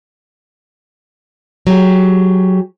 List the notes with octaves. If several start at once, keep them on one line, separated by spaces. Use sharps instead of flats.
F#3 G4 G#4